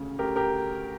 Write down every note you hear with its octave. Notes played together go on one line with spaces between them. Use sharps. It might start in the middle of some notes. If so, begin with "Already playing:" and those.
Already playing: D2 C#3
D2 G4 A#4
G4 A#4